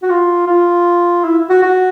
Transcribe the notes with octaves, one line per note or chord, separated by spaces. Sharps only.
F#4
F4
F4
E4
F#4
F#4